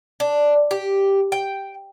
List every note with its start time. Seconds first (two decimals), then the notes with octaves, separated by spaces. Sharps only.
0.20 D4
0.71 G4
1.32 G5